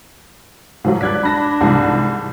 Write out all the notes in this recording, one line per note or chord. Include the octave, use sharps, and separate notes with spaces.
G#2 F3 F#3
G2 D5 F#6 G#6 B6
D4 B5 A#6 B6
C2 G#2 E3